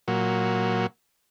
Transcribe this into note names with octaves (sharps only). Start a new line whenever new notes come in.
A#2 F#3